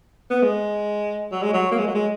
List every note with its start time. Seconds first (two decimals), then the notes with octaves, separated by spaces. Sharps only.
0.30 B3
0.42 G#3
1.32 F#3
1.43 G#3
1.53 F#3
1.71 A#3
1.78 G#3
1.87 F#3
1.94 G#3